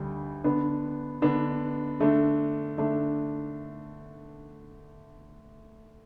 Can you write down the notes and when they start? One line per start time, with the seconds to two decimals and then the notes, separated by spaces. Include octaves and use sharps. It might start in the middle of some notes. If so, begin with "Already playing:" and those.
Already playing: D2 D3 G3
0.44 D3 B3 D4
1.22 D3 B3 D4
2.00 D3 A3 D4
2.78 D3 A3 D4